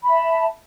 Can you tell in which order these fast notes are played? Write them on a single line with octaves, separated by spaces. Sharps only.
B5 E5 A5